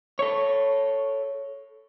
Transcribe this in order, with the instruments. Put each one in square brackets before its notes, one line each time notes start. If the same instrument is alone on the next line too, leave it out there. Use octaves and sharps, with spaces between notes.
[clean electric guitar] A4 C#5